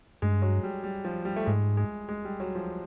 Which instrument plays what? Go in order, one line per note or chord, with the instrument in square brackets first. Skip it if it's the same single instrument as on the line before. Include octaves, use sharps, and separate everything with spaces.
[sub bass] G2 [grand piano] G#3
[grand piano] F#3
G3
G3
F3
G3
A3
[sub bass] G#2 [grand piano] G#3
[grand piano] G#3
G#3
G3
F#3
F3